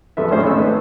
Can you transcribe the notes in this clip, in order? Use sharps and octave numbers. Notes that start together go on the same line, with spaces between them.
E2 F3 A4 B4 E5
G#1 A2 C#4 C5
G#1 D#3 C#4 A4 E6
B4